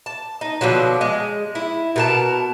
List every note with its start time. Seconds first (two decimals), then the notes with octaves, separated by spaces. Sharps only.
0.06 A5
0.41 D#4
0.61 B2 D3 F3 F#3
1.01 G#3
1.55 E4
1.96 B2 A#4 A5